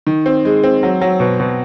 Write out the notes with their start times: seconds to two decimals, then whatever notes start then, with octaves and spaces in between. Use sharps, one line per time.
0.07 D#3
0.26 C4
0.45 G#3
0.64 C4
0.83 F#3
1.01 F#3
1.20 B2
1.40 B2